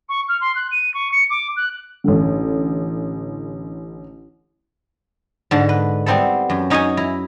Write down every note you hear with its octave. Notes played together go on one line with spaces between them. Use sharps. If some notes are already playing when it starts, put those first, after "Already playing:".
C#6
F6
C6
F#6
D#7
C#6
C#7
D6
F#6
A1 D3
G#2 D3 A5
B4
G3 B3 C4 E4 A4
F#2
C#4 D#4 G#4 C#5 D#5 G#5
E4 A#5